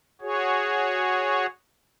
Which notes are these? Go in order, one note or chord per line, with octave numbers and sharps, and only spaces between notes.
F#4 G#4 C#5